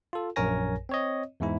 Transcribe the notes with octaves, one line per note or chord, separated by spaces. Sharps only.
F4 A4
A#1 F#2 A#4 C#5 G#5 A#6
C4 C#5 D#5
E2 G#2 E4